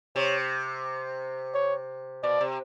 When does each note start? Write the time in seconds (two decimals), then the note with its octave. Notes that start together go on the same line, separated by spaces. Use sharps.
0.16 C3 C#5
1.54 C#5
2.23 B2 D5
2.41 C3